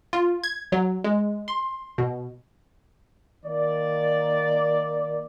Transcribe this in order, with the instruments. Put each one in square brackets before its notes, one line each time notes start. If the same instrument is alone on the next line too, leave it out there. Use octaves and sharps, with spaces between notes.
[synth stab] F4
G#6
F#3
G#3
C6
B2
[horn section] D#3 A#3 D5